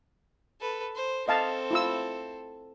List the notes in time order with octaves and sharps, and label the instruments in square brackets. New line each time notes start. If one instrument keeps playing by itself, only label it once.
[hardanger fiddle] A4 B4
C5
[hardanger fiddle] C4 A4 [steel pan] D#5 F5 A5
[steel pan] E4 F4 E6